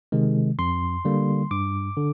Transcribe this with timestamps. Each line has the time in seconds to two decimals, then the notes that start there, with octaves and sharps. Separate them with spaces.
0.12 C3 D#3 G#3
0.59 F2 C6
1.05 D3 G3 A#3
1.51 G2 D6
1.97 D3